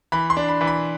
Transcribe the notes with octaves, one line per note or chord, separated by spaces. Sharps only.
E3 B5
C6
D4
B5
E3
B5